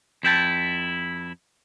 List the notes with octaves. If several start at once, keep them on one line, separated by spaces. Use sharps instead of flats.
F2 E4 G5 A5